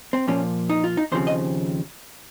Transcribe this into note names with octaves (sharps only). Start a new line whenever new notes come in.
C4
A#2 F3 A#3 C#4
D#4
F4
D#4
D#2 C#3 F3 C4 C5
D#5